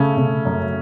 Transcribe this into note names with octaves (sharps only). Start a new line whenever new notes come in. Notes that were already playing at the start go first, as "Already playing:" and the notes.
Already playing: C#3 A3 C#4
C#3
F#2